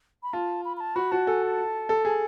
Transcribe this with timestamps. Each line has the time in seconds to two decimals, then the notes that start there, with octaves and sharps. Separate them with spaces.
0.23 B5
0.33 F4 A5
0.65 B5
0.77 B5
0.80 A5
0.96 F#4 B5
1.11 F#4 A5
1.27 A4 G#5
1.43 A5
1.89 A4
2.05 G#4